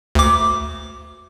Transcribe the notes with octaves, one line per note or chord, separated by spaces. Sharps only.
D2 D6